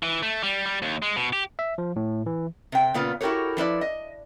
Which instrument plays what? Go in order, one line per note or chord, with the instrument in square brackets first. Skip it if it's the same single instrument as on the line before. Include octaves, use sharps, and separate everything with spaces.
[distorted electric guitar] E3
A3
G3
G3
D#2
G#3
B2
G4
[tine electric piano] E5
F3
A2
E3
[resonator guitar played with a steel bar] C3 G5
A#2 C#3 B3 F4
E4 F#4 G4 A4 A#4 C#5
F3 E4 B4 D5
D#5